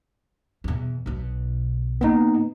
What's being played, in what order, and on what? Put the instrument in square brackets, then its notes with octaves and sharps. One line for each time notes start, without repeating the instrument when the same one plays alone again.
[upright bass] E2 B2
B1 B2
[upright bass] D3 A#3 [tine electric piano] B3 D#4